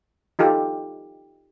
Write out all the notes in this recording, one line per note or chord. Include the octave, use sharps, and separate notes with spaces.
D#4 F4 G4 A4